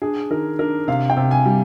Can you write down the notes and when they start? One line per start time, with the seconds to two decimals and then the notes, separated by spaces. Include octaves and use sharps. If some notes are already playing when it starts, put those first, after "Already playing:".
0.02 D4 G#4
0.30 D#3 A#4
0.59 D4 A#4
0.88 C3 F5
1.10 G5
1.17 C3
1.31 G#5
1.45 G3